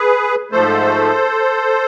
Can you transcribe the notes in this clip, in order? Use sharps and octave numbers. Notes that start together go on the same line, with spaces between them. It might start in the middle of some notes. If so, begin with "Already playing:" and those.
Already playing: G#4 B4
G#2 F3 A3 A4 C5